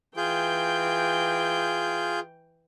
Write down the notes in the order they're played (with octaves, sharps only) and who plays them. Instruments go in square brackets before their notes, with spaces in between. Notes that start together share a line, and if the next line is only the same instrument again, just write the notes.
[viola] E3 G5 [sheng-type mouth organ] F4 G#4 G6